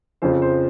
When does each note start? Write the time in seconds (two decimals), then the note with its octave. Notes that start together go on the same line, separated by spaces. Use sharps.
0.22 F2 C#3 F3 C5
0.42 C5